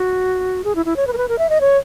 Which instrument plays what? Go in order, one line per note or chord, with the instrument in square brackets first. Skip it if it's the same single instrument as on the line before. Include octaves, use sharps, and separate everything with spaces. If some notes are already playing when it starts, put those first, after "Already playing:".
Already playing: [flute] F#4
G#4
E4
E4
C#5
B4
A#4
B4
A#4
E5
D#5
C#5